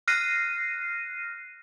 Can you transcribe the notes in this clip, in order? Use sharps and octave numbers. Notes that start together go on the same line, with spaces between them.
F6 F#6 A#6 C7 D#7